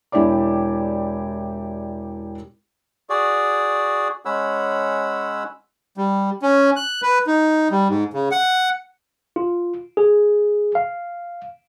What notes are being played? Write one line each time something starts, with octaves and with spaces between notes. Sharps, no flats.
E1 E4 G4 D5 D6
F#4 G#4 D5
G#3 C#4 C#5 F#5 B5 E6
G3
C#4
F#6
B4
D#4
G3
G#2
C#3
F#5
F4
G#4
F5